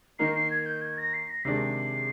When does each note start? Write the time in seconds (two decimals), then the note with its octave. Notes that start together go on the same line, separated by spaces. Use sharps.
0.19 D#3 A#3 D#4 C7
0.35 C7
0.50 G#6
0.66 G6
0.82 G#6
0.98 A#6
1.14 C7
1.30 A#6
1.44 C3 D#3 G#3 D4 C7